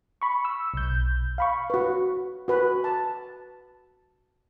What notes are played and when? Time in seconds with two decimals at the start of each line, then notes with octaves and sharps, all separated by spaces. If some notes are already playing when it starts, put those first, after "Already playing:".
0.22 B5 C#6
0.45 E6
0.74 B1 G6
1.38 F5 B5 C#6
1.70 F#4 B4
2.48 F#4 B4
2.84 A5